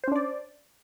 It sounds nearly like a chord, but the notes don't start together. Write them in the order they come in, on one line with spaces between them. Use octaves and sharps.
C5 C#4 D4 D5